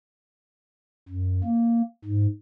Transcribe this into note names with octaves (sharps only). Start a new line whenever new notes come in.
F#2
A#3
G#2